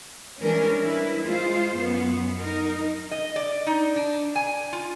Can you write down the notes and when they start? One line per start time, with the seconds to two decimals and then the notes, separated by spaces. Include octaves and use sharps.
0.42 E3 G3 G#3 C#4 D4 A#4
0.80 E4 B4
1.23 G#3 F4 C5
1.76 F#2 B3
2.41 D#4 A#4
3.11 D#5
3.36 D5
3.67 D#4
3.96 D4
4.36 G#5
4.73 F4